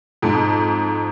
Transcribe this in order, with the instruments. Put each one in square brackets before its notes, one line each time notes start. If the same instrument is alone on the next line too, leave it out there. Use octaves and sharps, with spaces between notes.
[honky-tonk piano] F2 G#2